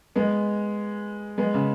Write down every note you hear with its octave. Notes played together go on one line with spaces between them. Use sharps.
G#3 B3
G#3 B3
C#3